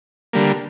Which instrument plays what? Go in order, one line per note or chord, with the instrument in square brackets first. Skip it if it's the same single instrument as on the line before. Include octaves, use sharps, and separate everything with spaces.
[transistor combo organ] D3 G3 A#3